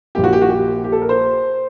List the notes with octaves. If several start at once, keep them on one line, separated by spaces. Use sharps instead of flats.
A#1 A#2 G4
F#4
G4
F#4
G4
G4
A4
A#4
C5